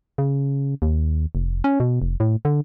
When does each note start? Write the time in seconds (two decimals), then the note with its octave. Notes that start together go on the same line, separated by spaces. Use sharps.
0.18 C#3
0.82 D#2
1.35 F1
1.64 C#4
1.80 B2
2.02 F1
2.20 A2
2.45 D3